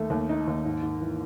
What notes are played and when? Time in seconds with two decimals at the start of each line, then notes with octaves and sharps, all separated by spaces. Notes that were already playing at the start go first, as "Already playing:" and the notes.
Already playing: D#2 D#3 A3 D#4
0.10 D#2
0.29 D#4
0.47 D#2
0.65 G#2
0.83 G#2
1.01 E3